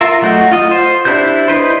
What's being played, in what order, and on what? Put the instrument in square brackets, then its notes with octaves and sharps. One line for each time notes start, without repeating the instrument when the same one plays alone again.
[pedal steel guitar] F4 A#4 E5
F#3 A3 D#4 F#4
F4 D#5
C5
D4 E4 G4 C5 G6
D#4 E4 B4 C5